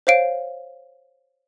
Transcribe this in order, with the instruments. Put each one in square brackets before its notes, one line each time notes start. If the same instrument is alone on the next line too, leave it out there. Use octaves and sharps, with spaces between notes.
[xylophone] C5 C#5 F5 D7